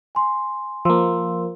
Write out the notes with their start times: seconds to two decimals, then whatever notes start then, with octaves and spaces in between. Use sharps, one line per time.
0.15 G#5 C6
0.85 F3 A#3 F5 C6 E6